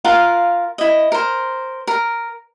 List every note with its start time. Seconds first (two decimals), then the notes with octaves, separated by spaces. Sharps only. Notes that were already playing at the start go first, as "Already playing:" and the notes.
0.05 F4 A#4 F5 F#5
0.78 E4 D#5
1.12 A#4 C5
1.87 A#4